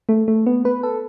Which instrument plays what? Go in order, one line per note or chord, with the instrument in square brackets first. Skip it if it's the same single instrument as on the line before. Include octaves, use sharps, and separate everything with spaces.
[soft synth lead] A3
A3
B3
B4
A4